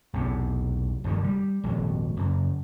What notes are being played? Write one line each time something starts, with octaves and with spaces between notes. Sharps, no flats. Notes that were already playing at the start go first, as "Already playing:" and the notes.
B1 E2 C3
F1 G2 D3 D#3
G3
D#1 G#1 F2 F#3
F#2 C#3